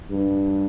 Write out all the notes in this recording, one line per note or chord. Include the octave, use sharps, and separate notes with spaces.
G2